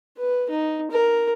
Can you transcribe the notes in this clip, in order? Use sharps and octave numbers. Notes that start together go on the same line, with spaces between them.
B4
D#4
A#4